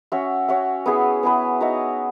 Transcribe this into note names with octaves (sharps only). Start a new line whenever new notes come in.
C#4 F#4 C#5 E5
C#4 F#4 C#5 E5
B3 E4 G#4 B4
B3 E4 G#4 B4
D#4 F#4 C#5 E5